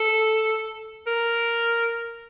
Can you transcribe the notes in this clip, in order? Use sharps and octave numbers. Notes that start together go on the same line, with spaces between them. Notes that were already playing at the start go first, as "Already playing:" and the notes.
Already playing: A4
A#4